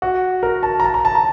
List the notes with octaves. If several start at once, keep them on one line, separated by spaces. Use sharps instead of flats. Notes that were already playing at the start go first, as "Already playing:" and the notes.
F#4
A#4
A5
A#5
A5
A#5
A5
A#5